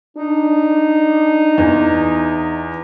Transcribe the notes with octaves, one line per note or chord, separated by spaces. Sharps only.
D4 D#4
E2